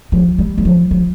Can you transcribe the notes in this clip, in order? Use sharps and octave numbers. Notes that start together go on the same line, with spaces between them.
F3
G3
G3
F3
F3